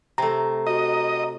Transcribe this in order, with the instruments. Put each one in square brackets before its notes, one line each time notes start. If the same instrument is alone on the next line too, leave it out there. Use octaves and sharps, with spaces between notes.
[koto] C3 A3 [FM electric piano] A#5
[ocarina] F#4 [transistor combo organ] D#5